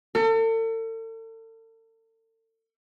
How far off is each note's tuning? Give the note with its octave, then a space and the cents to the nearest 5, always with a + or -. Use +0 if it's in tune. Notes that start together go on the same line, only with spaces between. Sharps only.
A4 +40